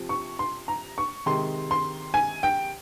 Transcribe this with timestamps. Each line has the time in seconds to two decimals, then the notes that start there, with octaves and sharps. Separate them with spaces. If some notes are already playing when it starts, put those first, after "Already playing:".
Already playing: C3 F3
0.09 C#6
0.39 C6
0.68 A#5
0.98 C#6
1.26 C3 D#3 G#3 C6
1.71 C6
2.14 G#5
2.43 G5